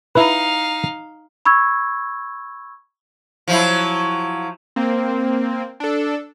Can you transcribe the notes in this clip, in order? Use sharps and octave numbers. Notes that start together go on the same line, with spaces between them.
D#4 E4 B4 F5
B5 C#6 E6 G#6
F3 F#3 E4
A#3 C4
D4 A4